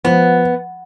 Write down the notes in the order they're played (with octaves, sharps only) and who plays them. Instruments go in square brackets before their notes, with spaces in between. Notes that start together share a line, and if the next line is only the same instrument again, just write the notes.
[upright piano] F3 [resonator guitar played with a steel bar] B3